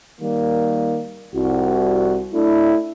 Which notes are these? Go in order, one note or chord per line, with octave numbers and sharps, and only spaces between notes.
D#3 G3 A#3
C2 F#4
A3 D4 E4